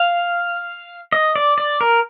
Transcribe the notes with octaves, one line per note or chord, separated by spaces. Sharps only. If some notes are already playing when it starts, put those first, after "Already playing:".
Already playing: F5
D#5
D5
D5
A#4